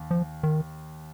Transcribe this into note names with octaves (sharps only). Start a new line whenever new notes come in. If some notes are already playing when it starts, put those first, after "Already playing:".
Already playing: D#2
F3
D#3